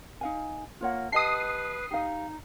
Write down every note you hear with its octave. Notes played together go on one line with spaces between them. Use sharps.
D#4 F5 G#5
A#3 F4 C#5 F#5
G4 B4 D#5 A5 D#6 C7
D#4 G4 F5